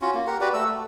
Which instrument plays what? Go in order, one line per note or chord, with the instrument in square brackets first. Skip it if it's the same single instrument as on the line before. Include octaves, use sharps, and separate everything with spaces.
[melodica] C#4 F4 F#4
A#3
G4 A#4 F#5
F#4 G4 B4 D5
A3 E6
A3